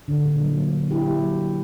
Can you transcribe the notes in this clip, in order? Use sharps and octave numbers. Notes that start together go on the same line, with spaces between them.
D3
A#2
F#3
A#3
A#2
A#2 E4 G4
F#3